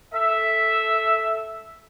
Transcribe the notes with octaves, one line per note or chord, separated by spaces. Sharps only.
A4 E5